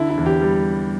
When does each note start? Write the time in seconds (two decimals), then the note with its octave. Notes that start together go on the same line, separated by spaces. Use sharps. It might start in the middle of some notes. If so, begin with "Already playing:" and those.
Already playing: D3 E4
0.10 E4
0.17 E2
0.26 G4
0.41 G3